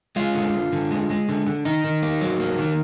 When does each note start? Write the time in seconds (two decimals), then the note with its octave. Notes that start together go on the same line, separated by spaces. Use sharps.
0.16 G#3 F4
0.35 D3
0.54 D3
0.72 D3
0.91 G#3
1.10 G#3
1.29 D3
1.47 D3
1.65 D#3 D#4
1.84 D#3
2.02 A#3
2.21 F#3
2.40 A#3
2.59 D#3